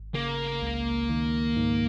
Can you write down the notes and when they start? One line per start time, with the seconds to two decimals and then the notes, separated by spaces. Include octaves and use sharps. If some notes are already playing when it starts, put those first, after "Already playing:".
Already playing: G#1
0.15 C#3 A#3
0.62 C#2
1.10 D#3
1.56 G#2